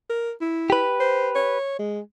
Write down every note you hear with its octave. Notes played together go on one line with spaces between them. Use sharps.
A#4
E4
G4 B4
C5
C#5
G#3